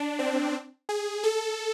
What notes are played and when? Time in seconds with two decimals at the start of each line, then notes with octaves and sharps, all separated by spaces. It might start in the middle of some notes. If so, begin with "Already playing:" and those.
Already playing: D4
0.19 C4
0.89 G#4
1.24 A4